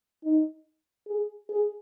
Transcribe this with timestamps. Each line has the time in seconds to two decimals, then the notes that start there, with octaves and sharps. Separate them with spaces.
0.25 D#4
1.07 G#4
1.49 G#4